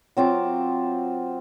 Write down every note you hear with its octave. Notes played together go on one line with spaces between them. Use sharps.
F#3 C4 F4 D6